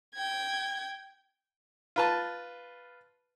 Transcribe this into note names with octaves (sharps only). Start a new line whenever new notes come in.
G5 G#6
F4 B4 A5